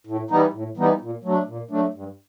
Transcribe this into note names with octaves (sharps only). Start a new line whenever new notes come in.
A2
E3 G3 B3 D#4
A2
E3 G3 B3 D#4
A#2
F#3 A3 D4
A#2
F#3 A3 D4
G2